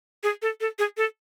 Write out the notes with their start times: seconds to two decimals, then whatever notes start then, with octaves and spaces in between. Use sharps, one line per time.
0.23 G#4
0.42 A4
0.61 A4
0.79 G#4
0.97 A4